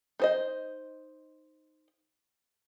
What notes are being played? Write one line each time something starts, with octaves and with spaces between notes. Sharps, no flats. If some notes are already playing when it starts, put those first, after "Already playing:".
D#4 C5 D#5